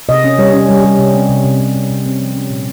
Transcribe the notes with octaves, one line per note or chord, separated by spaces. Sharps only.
C3 D#5
C#4
G3 C#5
C#4
G3
G3
C3
C4
C3
C3
C3
C3
C3
C4
F3
C#4
A#2